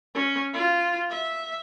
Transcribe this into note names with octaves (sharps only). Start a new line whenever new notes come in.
C#4
F4
E5